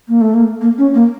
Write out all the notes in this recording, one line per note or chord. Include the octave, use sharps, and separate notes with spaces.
A#3
A3
A#3
A#3
C#4
A#3